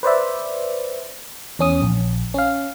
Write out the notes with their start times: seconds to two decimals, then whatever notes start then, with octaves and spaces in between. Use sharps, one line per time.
0.03 B4 C5 D5 E5
1.59 E2 C#4 D#6
1.82 A#1
2.34 C#4 F5